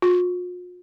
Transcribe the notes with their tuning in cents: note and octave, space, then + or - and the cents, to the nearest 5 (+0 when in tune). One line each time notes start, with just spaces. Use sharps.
F4 +45